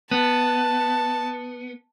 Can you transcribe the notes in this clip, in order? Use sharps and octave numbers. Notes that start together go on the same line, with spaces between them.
B3 A5